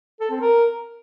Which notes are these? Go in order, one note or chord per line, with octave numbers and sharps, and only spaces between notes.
A4
C4
A#4